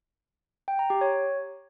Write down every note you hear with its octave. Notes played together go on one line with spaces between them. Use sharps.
G5
A#5
G4
C#5